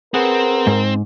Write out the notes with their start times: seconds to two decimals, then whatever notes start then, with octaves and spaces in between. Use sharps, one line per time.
0.14 C4 G#4 A#4 B4 F#5
0.67 G#2